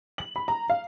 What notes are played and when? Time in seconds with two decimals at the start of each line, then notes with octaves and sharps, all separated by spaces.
0.18 F#7
0.36 B5
0.48 A#5
0.70 F5